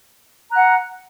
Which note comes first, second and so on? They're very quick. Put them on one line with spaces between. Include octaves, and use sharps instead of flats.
A#5 F#6 F#5